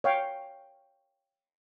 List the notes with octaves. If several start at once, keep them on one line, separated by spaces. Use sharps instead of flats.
C#5 F5 G5